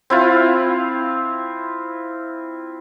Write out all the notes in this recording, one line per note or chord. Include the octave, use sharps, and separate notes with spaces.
C4 E4 F4